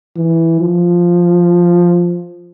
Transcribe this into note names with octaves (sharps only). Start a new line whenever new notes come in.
E3
F3